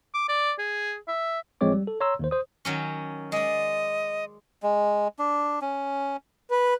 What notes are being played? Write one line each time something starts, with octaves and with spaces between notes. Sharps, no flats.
D6
D5
G#4
E5
A1 F3 G#3 C4 C#5 D6
G3
A4
C#5 A#5 C6 E6
D#2 D#3 C5
C5 D#6
D#3 F#3 C#4
G#3 D5 D#5
G#3
D4
C#4
B4